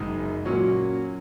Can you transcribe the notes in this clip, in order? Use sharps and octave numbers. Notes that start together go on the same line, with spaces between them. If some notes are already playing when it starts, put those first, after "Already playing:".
Already playing: F#1 F#2 C#3 G#3 D#4
A#2 F#3 C#4 F#4